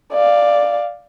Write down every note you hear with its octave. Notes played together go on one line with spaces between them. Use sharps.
D5 F5